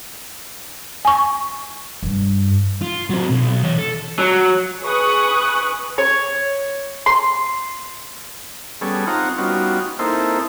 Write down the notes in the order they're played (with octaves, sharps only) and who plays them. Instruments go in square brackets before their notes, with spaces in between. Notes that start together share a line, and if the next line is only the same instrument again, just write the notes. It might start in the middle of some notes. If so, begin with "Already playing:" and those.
[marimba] G#5 C#6
[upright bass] G2
[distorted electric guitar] F4
F#3 C4
B1
E3 C#5
A4
[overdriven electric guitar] F#3
[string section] G#4 B4 C#6 D#6 F#6
[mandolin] C#5
C6
[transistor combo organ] G3 B3 C#4 G#4 A4
C4 D#4 F4 F#5 A#5 C#6
G3 B3 C#4 D#4 F4 F#4
A#3 C4 D#4 E4 A4 C5